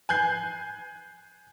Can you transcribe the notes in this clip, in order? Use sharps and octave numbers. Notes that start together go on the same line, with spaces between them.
G#5 F#6 G6 C7